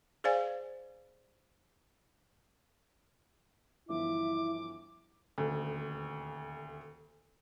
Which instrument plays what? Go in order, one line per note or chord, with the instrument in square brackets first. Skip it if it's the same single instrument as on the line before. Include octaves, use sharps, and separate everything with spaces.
[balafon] G#4 C5 D5 F5 G#5
[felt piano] G1 E3 F3 [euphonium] E4 [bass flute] E5 [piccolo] D6
[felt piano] D#1 D2